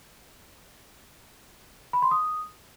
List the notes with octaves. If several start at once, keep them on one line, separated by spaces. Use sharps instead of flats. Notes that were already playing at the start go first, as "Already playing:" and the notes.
B5
C6
D#6